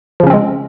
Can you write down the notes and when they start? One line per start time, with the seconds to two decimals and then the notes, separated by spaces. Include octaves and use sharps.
0.20 F3
0.23 C#3
0.27 C#4
0.30 C4
0.33 G#3